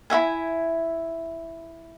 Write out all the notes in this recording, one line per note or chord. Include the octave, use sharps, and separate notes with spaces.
E4 F#4 E5 G#5